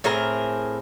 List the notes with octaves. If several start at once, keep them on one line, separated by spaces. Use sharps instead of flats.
A2 C4 G#4 A#4